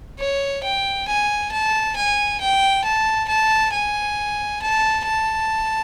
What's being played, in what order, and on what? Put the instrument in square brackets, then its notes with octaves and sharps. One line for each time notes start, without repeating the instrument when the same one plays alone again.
[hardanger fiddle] C#5
G5
G#5
A5
G#5
G5
A5
A5
G#5
A5
A5